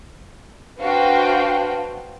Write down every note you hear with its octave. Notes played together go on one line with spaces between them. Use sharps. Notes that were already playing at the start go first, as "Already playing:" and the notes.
D4 F#4 B4 C5 F5 G5